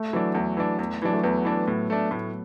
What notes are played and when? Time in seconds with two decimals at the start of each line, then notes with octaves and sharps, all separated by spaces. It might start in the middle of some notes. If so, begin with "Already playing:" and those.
Already playing: A3
0.13 E3 F#3 D4
0.35 E2 A3
0.57 E3 D4
0.79 E2
1.02 E3 F#3 D4
1.13 A3
1.23 E2 B3
1.45 E3 D4
1.67 A2
1.90 A3 D4
2.11 A2